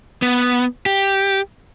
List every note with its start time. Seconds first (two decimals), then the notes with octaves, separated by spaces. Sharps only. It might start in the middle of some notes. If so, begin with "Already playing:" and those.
0.22 B3
0.86 G4